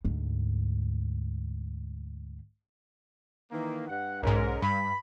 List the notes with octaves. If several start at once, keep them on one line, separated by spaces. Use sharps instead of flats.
D2 G#2
D#3 E3 A#3
G2 F#5
B1 G#2 G#3 C#4 A#4
G2 B5